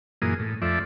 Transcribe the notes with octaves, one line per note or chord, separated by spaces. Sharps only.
F#2 A#2 E3 A#3 G#4 D#6
A2
F2 F3 A3 D5 E5